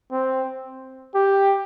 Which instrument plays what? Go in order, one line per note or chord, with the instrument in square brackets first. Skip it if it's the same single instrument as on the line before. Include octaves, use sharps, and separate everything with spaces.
[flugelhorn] C4
G4